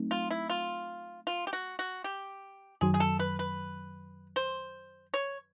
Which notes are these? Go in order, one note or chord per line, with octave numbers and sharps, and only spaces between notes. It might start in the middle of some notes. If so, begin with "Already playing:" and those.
Already playing: F#3 A3 C4 D#4
F4
E4
F4
F4
G4
F#4
F#4
G4
F#2 D#3 F#3 G#4
G#4
A4
B4
B4
C5
C#5